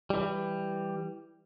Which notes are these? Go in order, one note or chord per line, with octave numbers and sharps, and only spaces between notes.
E3 G3